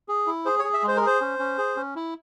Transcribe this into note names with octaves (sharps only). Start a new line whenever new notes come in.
G#4
E4
G#4 C5
C#5
G#4
E5
G#3 C5
A#4
G#4 C5
C#4
C#4
G#4
C#4
E4